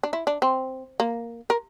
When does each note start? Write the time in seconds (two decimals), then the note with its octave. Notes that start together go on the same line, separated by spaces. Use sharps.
0.03 D4
0.13 E4
0.27 D4
0.42 C4
1.00 A#3
1.50 A#4